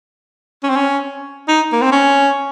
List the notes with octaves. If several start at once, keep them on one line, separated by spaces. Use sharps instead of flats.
C#4
C4
C#4
D#4
A#3
C4
C#4